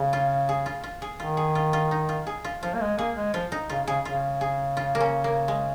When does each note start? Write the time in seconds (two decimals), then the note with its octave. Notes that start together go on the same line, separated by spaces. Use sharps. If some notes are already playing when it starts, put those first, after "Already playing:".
Already playing: C#3
0.13 F4
0.49 G#4
0.66 F4
0.84 F4
1.02 G#4
1.19 D#3 F4
1.37 G#4
1.55 F4
1.73 F4
1.91 D#4
2.09 F4
2.27 G#4
2.44 F4
2.63 F3 F4
2.75 A#3
2.81 G#3
2.98 A#3 G#4
3.17 G#3
3.34 F3 F4
3.52 D#4
3.69 C#3 F4
3.87 C#3 G#4
4.05 C#3 F4
4.41 G#4
4.77 F4
4.95 A#3
5.00 C#4
5.24 A#3
5.48 G#3